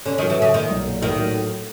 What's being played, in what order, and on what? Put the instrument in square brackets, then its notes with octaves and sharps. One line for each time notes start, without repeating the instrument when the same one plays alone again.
[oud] D3 [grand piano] C#4
[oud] D#3
[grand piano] F#3
[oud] E3
[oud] C#3 [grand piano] A3
[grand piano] A#2 [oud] D#3
[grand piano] B1
A#2
[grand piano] A2 [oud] D#3
[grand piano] F#3
A3